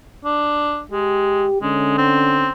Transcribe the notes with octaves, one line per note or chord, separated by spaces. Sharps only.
D4
G#3 G4
D3 G#3 C#4
C4